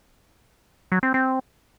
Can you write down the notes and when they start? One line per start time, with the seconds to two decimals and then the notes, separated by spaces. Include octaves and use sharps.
0.92 F#3
1.03 C4
1.14 C4